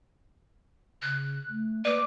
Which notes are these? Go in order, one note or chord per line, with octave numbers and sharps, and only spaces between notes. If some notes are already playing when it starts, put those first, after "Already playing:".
C#3 F#6
A3
A#3 B4 D5 D6